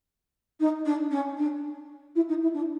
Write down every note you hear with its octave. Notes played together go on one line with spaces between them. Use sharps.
D#4
D4
C#4
D4
E4
D#4
E4
D4